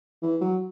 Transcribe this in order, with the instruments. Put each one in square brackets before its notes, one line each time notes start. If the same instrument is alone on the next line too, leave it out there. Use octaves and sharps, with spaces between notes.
[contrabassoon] E3
F#3